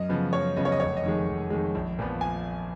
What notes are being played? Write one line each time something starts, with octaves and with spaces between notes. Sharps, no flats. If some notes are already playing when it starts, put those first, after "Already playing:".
Already playing: F#2 D#5
C#3 F3 B3
F#2 C#5
C#3 F3 B3 D#5
C#5
D#5
F1 C#5
D#5
F2 D#3 G#3
F1
F2 D#3 G#3
A#1
A#2 F3 B3
G#5